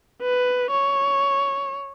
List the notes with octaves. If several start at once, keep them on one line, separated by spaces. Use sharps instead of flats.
B4
C#5